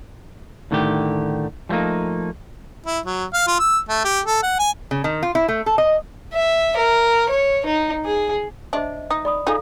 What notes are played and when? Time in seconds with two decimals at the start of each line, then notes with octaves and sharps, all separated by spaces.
0.71 A2 D3 D#3 A3 G4
1.69 F3 G3 A3 A#3 D#4
2.86 E4
3.06 F#3
3.34 F5
3.47 F4
3.59 E6
3.89 A3
4.04 G4
4.25 A4
4.43 F#5
4.59 G#5
4.91 C#3
5.04 D#3
5.23 F4
5.35 E4
5.48 A3
5.66 A4
5.78 D#5
6.33 E5
6.77 A#4
7.30 C#5
7.65 D#4
8.05 G#4
8.73 D4 C5 D#5 E5
9.10 D#4 D#6
9.25 D5 B5 D#6
9.47 D#4 F4 G#4 A4 F5